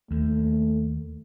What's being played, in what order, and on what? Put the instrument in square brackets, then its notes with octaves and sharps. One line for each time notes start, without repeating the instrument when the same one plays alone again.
[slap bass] D#2 [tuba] A3